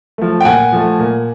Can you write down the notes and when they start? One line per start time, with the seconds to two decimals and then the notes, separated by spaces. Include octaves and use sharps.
0.18 F3 A3
0.41 G5
0.45 A#2 F#5 G#5
0.72 F3 A3
0.99 A#2